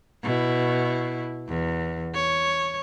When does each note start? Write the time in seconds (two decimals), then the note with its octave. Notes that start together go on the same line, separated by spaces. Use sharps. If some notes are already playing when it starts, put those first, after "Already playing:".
0.23 B2 E4
1.49 E2
2.14 C#5